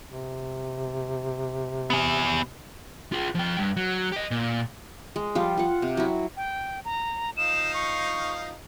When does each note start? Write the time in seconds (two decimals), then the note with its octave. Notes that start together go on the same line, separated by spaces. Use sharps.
0.11 C3
1.90 B3 G#5
3.12 F4 G#4
3.35 F3 G5
3.58 G2
3.77 F#3
4.12 G4 D#5
4.31 A#2
5.16 G#3
5.35 F3 G3 F4
5.57 F4 F#5
5.82 C3
5.97 F#3 E4
6.37 G5
6.85 A#5
7.37 F3 D#4 F5 E7
7.74 C#6